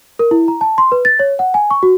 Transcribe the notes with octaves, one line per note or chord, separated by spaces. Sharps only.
A#4
E4
A#5
A5
C6
B4
A6
C#5
F#5
G#5
C#6
F#4